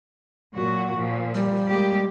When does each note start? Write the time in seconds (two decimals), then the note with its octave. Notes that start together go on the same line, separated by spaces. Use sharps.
0.56 A#2 F#3 F#4
0.96 A#2 F3
1.35 G3
1.69 G#3 A#3 G4